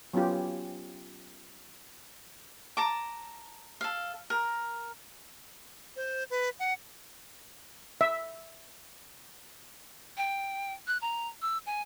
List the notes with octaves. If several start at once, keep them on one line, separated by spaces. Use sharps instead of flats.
F#3 B3 C#4 F4 G4
A5 A#5 D6
A4 F5
A#4
C5
B4
F#5
E5
G5
F#6
A#5
E6
G#5